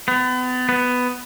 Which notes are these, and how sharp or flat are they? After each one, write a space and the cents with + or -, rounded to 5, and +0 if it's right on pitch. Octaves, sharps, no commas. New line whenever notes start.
B3 +35
B3 +10